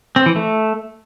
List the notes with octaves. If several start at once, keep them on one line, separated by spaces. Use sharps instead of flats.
C4
E3
A3